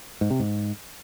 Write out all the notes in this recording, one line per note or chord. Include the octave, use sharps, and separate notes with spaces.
G#2
C3
G#2